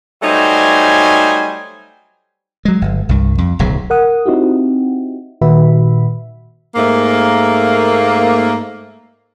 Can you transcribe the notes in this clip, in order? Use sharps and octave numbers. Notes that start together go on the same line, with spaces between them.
F#3 G3 A3 D#4 C5 G#5
F#3 G#3
G1
C2 G2
F2
D1 B1 C#3 F#3
A#4 F#5 D#6
C4 D#4 E4 F#4 G4
A#2 D#3 F#4 B4 E5 B5
G#2 A3 A#3